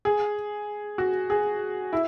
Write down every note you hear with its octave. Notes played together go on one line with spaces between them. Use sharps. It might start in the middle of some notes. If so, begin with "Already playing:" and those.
G#4
F#4
G#4
E4